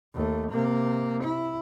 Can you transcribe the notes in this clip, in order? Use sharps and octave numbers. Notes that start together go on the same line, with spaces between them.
D#2 A3
C3 A#3
E4